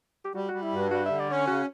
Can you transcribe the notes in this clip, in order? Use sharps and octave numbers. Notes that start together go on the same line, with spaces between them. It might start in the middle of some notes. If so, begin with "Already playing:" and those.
G4
G3 F#4
G3 F#4
E4
G2 F#4
G3 F#4
D3 E5
D5
C#4 C#5
C#3 F#4